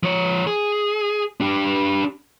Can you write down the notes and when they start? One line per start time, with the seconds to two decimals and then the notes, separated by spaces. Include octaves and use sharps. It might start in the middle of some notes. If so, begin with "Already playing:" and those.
0.03 F3 C#5
0.47 G#4
1.40 D4 G4